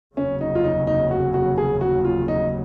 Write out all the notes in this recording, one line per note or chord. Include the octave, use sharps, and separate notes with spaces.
F1 D#2 C#3 F#3 C#4
D#4
F4
D#4
D#4
F#4
F#4
G#4
F#4
F4
D#4